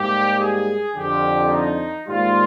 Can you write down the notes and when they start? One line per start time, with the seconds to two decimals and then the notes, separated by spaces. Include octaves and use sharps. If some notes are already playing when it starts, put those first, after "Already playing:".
Already playing: G#2 G3 A#3 G4
0.39 G#4
0.95 F2 D3 F3 G4
1.51 D#4
2.07 G#2 D#3 G3 A#3 F4